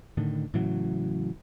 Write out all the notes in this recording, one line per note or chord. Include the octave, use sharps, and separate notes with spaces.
A2 D3 D#3
A2 C#3 E3 F#3